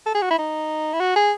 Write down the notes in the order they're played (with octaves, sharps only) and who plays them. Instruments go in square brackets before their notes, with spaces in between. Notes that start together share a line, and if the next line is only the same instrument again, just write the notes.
[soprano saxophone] A4
G#4
F#4
E4
D#4
E4
F#4
G#4